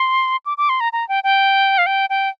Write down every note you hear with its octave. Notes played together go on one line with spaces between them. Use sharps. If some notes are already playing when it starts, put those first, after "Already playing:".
Already playing: C6
D6
D6
C6
A#5
A#5
G5
G5
F5
G5
G5